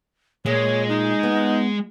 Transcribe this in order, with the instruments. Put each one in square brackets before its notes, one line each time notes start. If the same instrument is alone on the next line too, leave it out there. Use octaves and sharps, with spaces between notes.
[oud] A#2 [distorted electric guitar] G#3 [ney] C#5
[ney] D#4
[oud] B3